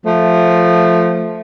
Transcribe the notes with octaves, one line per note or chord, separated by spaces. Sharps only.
F3 A3